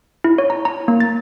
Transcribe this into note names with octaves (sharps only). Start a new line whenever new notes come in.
E4
C#5
A#5
A#5
A#3
A6